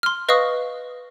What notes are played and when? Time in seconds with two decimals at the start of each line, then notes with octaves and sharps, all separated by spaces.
0.03 C6 F6
0.29 B4 D#5 F5 C#6 D#6